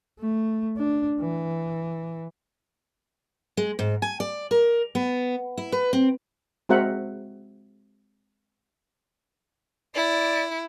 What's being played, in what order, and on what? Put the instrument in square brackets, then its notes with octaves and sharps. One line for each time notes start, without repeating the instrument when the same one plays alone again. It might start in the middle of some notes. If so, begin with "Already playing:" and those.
[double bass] A3
D4
E3
[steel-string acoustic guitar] G#3
G#2
G#5
D5
A#4
B3
E4
B4
C4
[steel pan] G#3 C4 F#4 A#4 E5 F#5
[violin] E4 [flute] D5